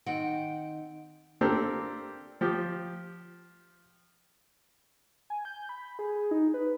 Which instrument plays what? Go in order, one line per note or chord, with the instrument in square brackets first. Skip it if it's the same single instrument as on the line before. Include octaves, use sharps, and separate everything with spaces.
[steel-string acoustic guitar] D#3 C4 F#5 G5
[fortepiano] A#3 C4 D4 G4 A4 A#4
F3 G4
[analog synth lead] G#5
G6
B5
G#4
D#4
B4